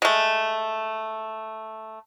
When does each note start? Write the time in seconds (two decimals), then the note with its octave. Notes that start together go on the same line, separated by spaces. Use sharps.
0.02 G#3 A3